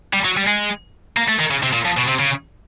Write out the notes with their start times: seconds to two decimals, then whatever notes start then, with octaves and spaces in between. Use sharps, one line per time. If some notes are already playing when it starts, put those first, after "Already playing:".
0.13 G3
0.25 F#3
0.37 G3
0.47 G#3
1.17 A#3
1.29 A3
1.40 D#3
1.51 C#3
1.63 C3
1.73 A#2
1.85 F2
1.97 B2
2.08 C3
2.19 C#3